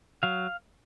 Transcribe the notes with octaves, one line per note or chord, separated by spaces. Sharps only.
F#3 F5